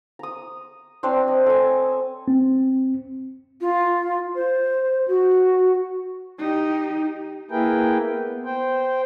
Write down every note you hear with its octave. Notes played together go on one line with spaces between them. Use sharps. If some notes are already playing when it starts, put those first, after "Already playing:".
A#5 D#6
C4 D4 C#5 D5
D#5
A4 G#5
C4
F4
C5
F#4
D#4 G4
A#3 E4 G#4 A#4 B4 G5
B3
C5 G5